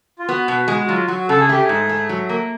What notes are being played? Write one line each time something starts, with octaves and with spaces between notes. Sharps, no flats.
F4
B3 F#4
B2
G#3
F#4
F#3 F4
F#3 F#4
C#3 A4
G#4
A3 G4
G#4
G#2
A3
F#3
A#3